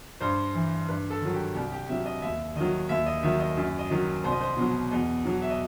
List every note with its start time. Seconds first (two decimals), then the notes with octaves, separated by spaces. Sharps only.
0.21 G2 C5
0.55 E3
0.88 G2 B4
1.10 A4
1.22 D#3 F#3
1.33 G4
1.55 C2 G4
1.72 G4
1.89 C3 F#3 E5
2.06 D#5
2.22 D#2 E5
2.56 D#3 F#3 D#5
2.89 D#2 E5
3.06 D#5
3.23 D#3 F#3 E5
3.40 D#5
3.57 F#2
3.79 D#5
3.90 D#3 F#3
4.24 C2 C5
4.32 D#5
4.41 C5
4.57 B2 F#3
4.91 E2 D#5
5.25 B2 F#3
5.42 E5
5.50 D#5